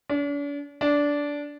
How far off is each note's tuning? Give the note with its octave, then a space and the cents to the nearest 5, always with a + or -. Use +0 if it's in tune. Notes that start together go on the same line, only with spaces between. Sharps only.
D4 -45
D4 -15